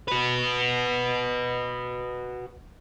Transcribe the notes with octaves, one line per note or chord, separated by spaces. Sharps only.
F#4 B4